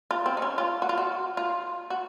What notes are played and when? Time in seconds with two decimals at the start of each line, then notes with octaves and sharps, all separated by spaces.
0.11 F4
0.26 C4
0.37 D#4
0.42 C#4
0.58 F4
0.82 F#4
0.89 F4
0.97 F#4
1.37 F4
1.90 F#4